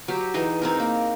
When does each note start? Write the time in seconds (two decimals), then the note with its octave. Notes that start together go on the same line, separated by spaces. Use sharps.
0.08 F#3 G4
0.34 E3 D#4 G#4 D#5
0.62 C4 D#4 A#4
0.80 A#3